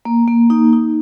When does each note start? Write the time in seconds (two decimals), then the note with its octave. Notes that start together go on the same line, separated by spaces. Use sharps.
0.05 A#3
0.28 A#3
0.50 D#4
0.73 D#4